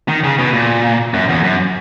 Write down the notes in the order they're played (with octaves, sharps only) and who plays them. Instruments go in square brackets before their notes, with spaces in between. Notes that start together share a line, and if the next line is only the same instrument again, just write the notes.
[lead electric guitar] D#3
C#3
B2
A#2
F#2
E2
F#2